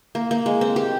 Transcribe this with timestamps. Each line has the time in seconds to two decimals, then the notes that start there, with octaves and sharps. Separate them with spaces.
0.15 A#3
0.31 A#3
0.46 G#3
0.61 C4
0.76 G4